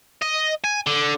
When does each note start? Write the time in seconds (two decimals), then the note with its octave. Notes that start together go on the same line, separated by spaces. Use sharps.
0.22 D#5
0.64 G#5
0.87 D3